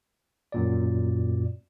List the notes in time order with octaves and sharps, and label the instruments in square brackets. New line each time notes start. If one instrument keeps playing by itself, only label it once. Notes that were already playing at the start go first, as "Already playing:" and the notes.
[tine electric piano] F#2 A#2 D5